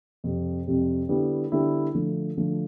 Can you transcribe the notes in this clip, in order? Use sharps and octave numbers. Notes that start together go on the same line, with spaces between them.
F2 C3 G3
F2 C3 G3
D3 G3 B3 E4
D3 G3 B3 E4
D3 F3 A3
D3 F3 A3